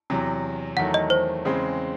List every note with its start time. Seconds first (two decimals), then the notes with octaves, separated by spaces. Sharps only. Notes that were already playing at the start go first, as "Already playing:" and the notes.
0.10 E2 C3 F#3
0.76 E2 D#3 F#3 A3 F#5
0.94 D#5
1.10 C5
1.45 E2 C#3 G#3 C4